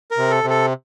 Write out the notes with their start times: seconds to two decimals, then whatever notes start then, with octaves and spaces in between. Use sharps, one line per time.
0.11 A#4
0.18 C3
0.30 A4
0.44 C3
0.50 A4